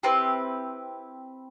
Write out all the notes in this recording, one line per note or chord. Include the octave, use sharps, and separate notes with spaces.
C4 E4 G4 B4